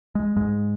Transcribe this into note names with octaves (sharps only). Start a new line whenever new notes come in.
G#3
G#2 G#3